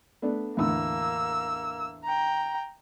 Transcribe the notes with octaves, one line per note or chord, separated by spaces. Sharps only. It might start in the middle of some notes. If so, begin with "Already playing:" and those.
A3 B3 D4
E2 A2 D3 A#3 E6
G5 A#5